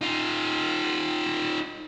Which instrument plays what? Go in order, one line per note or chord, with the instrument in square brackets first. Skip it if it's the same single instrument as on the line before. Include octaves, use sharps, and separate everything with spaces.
[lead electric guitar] D#4 F4